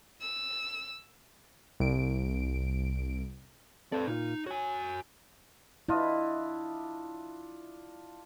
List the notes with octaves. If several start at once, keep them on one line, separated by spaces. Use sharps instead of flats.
E6
C2 D7
C4 A4 B4 D5
A#2 D#4 F4
F#4 C#5 G#5
D4 E4 F4 D#5